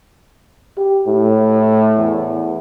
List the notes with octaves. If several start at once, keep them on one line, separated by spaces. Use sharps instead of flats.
G4
A2
E2